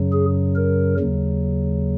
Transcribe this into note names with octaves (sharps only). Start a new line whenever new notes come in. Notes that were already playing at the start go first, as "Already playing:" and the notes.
Already playing: F#2 C#3 F#3
G#4
A#4
D#2 C#3 F#3